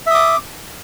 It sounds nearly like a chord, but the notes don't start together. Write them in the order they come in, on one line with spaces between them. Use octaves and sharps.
E5 D#6 D6